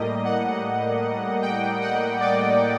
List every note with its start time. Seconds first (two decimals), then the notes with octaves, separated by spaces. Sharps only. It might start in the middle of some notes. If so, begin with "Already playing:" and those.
Already playing: A2 G3 A#3 D#5
0.24 F#5
1.42 G5
1.82 F#5
2.20 D5